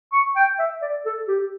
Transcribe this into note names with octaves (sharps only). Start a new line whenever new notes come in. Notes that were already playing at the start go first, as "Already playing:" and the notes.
C#6
G5
E5
D5
A4
G4